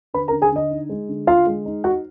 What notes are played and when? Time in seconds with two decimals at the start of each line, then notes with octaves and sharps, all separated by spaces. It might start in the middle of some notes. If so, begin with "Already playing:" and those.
0.14 D3 B4 B5
0.28 A#4 A#5
0.32 D3
0.42 G#4 G#5
0.52 D3 D#5
0.71 D#4
0.89 G#3
1.09 D3
1.27 D3 F4 F5
1.47 G#3
1.65 D#4
1.84 D#4 F#4 F#5